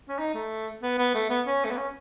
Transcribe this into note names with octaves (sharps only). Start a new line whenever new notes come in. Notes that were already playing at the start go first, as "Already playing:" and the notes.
C#4
D#4
A3
B3
B3
A3
B3
C#4
A3
B3
C#4